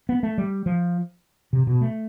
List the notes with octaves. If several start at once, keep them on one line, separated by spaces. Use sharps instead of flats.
B3
A3
G3
F3
C3
B2
A3